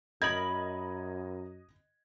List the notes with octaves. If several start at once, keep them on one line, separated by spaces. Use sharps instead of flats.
F#2 A#4 D#5 B5 D#6 G#6 F#7